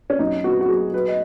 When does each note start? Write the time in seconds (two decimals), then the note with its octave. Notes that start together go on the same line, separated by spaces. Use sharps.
0.10 C#4
0.19 F#2 D#4
0.44 B3 F#4
0.61 F#4
0.69 F#3 G#4
0.93 F#3 B4
1.08 D#5